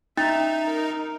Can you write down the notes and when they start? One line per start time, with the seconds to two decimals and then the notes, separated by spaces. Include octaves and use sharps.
0.17 C#4 D#4 E5 A6
0.65 A#4